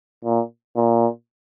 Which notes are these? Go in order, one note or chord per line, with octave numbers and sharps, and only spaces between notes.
A#2
A#2